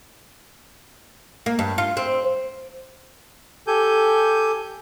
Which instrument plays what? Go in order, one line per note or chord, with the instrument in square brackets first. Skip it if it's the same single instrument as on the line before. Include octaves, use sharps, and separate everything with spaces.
[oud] A#3
G2
F4
C4
[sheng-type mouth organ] G4 A4 G#5 G6